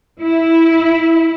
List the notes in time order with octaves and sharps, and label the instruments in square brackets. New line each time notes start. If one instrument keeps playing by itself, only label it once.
[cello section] E4